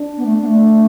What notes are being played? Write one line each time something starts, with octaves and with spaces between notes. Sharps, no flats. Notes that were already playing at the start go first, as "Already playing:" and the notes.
Already playing: D4
B3
A3
B3
A3